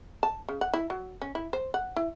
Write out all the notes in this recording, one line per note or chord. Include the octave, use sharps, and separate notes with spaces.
A5
C#3
F#5
E4
F#3
C#4
E4
C5
F#5
E4